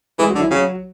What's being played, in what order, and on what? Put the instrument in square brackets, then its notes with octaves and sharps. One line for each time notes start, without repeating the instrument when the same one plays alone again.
[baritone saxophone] E3 [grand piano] G#3 G#4
[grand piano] F#3 F#4
[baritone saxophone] D3
[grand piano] E3 E4
[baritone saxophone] C#3 [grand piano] F#3 F#4